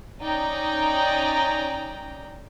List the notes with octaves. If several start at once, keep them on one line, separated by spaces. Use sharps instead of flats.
C#4 D#4 D5 G5 A#5